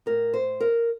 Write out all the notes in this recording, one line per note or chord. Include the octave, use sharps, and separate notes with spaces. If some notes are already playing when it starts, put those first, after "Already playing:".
A2 A#4
C5
A#4